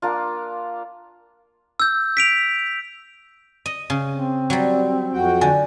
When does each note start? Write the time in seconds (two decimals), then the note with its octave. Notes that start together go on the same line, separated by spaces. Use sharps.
0.02 A#3 D4 F4
1.80 E6 G6
2.17 B6 D7 F7
3.66 D#5
3.90 C#3
4.12 C4
4.50 F#3 G3
5.13 F2 F#4 G5
5.41 D3 G#5